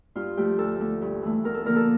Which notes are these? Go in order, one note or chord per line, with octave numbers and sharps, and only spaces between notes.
G2 F4
F3 A3 G4
D2 A4
D3 A3
G2
E3 A3
E2 A#4
A4
D3 F3 A#3 A#4
A4